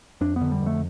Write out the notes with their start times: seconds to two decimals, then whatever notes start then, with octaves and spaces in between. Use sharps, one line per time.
0.21 F2 D4
0.36 B3
0.41 D3
0.51 G3
0.62 F2 A3